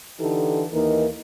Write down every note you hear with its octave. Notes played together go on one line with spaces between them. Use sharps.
D3 E3 D#4 G4 A4
D#2 E3 A#3 D#4 A#4 D#5